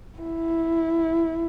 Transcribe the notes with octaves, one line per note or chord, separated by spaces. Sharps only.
E4